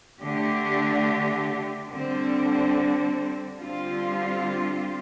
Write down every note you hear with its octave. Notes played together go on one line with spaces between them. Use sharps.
D3 A3 D4 G4
D3 G3 C4
D3 G3 C4 F4